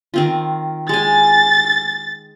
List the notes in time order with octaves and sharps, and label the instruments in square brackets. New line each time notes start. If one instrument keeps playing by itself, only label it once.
[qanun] D#3 C4 F4
[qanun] G#3 G#5 [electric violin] A6